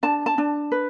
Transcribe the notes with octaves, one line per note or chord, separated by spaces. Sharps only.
D4 A5
A5
D4
B4